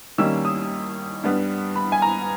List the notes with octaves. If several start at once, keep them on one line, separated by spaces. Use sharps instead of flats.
D#2 D#3 G3 A#3 C#4 E6
D#6
G2 G3 B3
B5
G#5
A#5